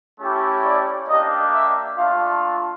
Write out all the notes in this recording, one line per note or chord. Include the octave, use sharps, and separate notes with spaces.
A3 C#4 E4 G4
D5
A#3 D4 G4 D#5
E5
A3 D4 F4 F5